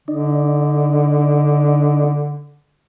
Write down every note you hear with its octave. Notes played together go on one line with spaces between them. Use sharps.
D3 D4 D#4